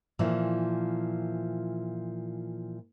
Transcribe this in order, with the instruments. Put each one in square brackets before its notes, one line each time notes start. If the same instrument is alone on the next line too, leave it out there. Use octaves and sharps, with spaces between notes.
[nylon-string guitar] A#2 E3 F3